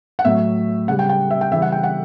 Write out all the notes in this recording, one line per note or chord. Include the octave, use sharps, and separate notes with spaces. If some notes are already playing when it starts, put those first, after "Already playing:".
F#5
A2 F#3 E5
C#3 G3 F#5
G5
G5
E5
G5
C#3 E3 G3 E5
F#5
G5
F#5